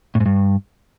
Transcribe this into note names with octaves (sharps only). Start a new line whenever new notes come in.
A2
G#2
G2